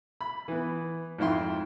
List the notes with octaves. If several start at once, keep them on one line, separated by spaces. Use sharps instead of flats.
B5
E3 B3
F2 G#2 E4 G5 C6